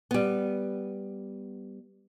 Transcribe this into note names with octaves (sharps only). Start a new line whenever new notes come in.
G3 B3